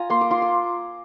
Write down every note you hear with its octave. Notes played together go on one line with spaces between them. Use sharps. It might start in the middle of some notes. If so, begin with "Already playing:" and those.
Already playing: F4 G#5 A#5
A#3 C6
D6
F4 C6
D6